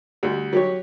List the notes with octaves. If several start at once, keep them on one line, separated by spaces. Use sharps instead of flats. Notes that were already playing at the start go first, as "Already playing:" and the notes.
D2 G3
F#3 G4 C#5